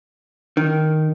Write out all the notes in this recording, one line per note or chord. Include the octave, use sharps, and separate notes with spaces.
D#3